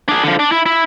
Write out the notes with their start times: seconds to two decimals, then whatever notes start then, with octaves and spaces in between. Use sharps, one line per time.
0.09 D4 G#4
0.24 D3 F3
0.39 D4
0.52 E4
0.66 E4